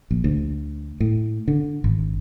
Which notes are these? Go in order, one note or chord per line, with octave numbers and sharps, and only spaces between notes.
A#1
D2
A2
D3
G#1